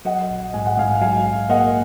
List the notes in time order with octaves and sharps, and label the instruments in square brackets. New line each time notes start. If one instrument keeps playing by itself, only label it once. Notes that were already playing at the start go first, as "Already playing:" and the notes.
[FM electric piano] F#3 [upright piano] D#5 F#5
[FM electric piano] A#1
[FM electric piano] G#2 [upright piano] G#5
[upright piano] F#5
[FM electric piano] G#2 [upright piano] F5 G#5
[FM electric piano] F#3 [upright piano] F5 G#5
[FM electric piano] A#1
[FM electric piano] A#3 [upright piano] D#5 F#5